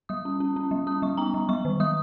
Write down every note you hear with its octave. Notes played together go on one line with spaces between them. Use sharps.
G3 D#6
C#4
C#4
C#4
G3
C#4 D#6
G3 C#6
B3 A#5
G3
G3 C#6
D#3
G3 D#6